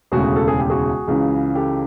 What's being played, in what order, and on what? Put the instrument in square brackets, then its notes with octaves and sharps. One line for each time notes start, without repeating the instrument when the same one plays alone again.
[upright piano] E1 D2 C#3 F#4 G#4
A4
G#4
G4
F#4 G#4
C#2 C#3 E3
G4 A4